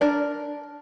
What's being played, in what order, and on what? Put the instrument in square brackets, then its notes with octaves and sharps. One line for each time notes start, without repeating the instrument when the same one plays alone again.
[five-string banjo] D4 A#4 D5